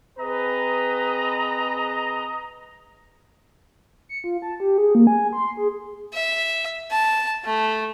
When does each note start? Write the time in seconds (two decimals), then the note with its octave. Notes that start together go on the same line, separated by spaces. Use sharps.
0.19 C4 G#4 B4 D#5 A#5
4.09 C#7
4.24 F4
4.42 A5
4.60 G4
4.78 G#4
4.95 A#3
5.07 G#5
5.33 C6
5.57 G#4
6.14 E5
6.91 A5
7.45 A3